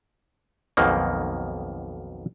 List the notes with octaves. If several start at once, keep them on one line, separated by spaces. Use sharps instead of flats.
B1 F2 B2 D#3 A#3